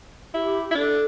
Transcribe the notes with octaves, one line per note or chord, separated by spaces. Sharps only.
E4 G4
E4
D4 A4